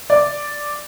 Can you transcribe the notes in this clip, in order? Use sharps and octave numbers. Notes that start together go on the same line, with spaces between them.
D5